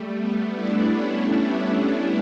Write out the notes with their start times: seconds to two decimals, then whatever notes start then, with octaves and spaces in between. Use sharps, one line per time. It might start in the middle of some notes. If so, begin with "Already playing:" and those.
Already playing: G3 A3
0.18 A3 B3
0.56 D4 E4
0.93 B3 C#4